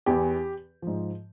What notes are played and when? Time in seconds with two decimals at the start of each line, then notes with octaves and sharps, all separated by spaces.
0.06 E2 E3 G4
0.82 G#2 F3